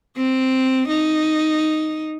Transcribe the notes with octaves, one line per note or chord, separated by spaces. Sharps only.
C4
D#4